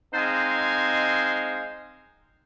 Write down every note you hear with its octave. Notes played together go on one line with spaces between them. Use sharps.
G#3 C4 D#4 C5 F5 G#5